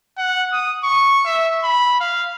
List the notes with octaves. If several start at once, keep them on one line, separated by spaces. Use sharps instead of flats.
F#5
D#6
C#6
E5
B5
F5